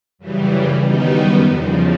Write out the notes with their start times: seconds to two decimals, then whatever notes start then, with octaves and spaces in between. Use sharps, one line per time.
0.19 F#2 C#3 E3 G3
0.82 F#2 D#3 G3 B3 D#4
1.46 E2 C#3 F3